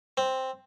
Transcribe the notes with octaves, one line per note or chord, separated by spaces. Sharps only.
C4